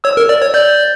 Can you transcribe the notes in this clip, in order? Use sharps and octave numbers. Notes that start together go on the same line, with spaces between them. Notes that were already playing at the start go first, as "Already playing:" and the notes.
C#5 E6
A#4
D5
C#5
D5 G6